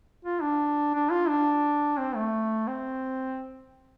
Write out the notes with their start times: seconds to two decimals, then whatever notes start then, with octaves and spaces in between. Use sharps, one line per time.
0.25 F4
0.42 D4
0.94 D4
1.11 F4
1.29 D4
1.98 C4
2.15 A3
2.67 C4